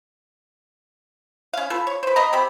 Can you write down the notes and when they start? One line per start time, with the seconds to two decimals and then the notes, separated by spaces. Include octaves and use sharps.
1.53 C#4 F5
1.70 F4 A4 B4
1.87 C#5
2.03 B4 C5
2.16 D3 B3 D#5 A#5
2.33 C3 C4 G4 B5